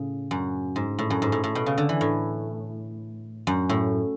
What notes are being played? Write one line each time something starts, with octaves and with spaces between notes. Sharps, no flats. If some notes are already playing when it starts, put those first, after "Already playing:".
Already playing: A2 C#3
F#2
G#2
A2
F#2
G#2
A2
A2
B2
C#3
D3
E3
A2
F#2
A2